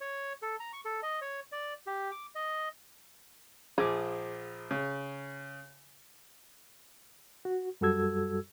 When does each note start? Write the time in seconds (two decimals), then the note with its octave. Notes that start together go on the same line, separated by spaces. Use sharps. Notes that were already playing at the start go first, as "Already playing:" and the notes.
0.01 C#5
0.42 A4
0.60 A#5
0.73 C#6
0.85 A4
1.03 D#5
1.22 C#5
1.52 D5
1.87 G4
2.11 D6
2.35 D#5
3.78 A#1 F3 G#4 D6
4.71 C#3
7.45 F#4
7.81 F#2 G3 F#4 A4 E6 G#6